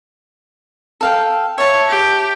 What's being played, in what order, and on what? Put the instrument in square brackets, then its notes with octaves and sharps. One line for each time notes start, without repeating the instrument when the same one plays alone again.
[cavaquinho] A4 F5 G5
[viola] C#5 [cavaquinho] E5 A5
[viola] G4